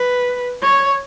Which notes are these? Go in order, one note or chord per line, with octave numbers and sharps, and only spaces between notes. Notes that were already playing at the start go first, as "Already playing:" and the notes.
Already playing: B4
C#5